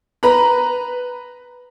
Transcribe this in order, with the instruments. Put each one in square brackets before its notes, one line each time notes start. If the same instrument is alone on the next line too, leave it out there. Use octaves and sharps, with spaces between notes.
[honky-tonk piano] B4 A#5 B5